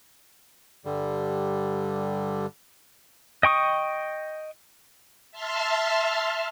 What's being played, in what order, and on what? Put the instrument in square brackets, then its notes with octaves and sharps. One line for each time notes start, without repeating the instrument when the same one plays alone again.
[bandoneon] G2 D3 G3
[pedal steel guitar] D#5 G5 C#6 D#6
[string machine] E5 A5 C6 F6